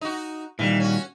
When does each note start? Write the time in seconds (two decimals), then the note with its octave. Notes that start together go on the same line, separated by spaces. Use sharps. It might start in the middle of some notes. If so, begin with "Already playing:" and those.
0.01 D#4 F#4
0.59 A#2 D#3 E3 G3
0.80 C#4 F#4